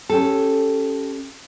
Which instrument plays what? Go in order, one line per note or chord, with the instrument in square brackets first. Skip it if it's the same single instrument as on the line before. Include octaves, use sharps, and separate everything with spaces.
[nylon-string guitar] C#4 G4 A4